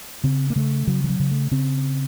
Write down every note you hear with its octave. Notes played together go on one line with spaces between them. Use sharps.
C#3 C4
A#3
C#3 A3
C#3 F#3
F3
F#3
C#3
A3
C#3 C4